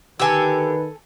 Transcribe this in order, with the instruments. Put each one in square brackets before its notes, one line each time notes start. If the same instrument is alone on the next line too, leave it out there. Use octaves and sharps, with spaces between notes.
[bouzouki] D3 G4 [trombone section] D#3 B4 [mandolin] A4 G#5 E6